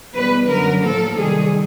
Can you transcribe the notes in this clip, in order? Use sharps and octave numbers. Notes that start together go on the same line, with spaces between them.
E2 B2 G3 B4
F#2 D3 F#3 A#4
A2 F3 A#3 A4
C3 D#3 G3 G#4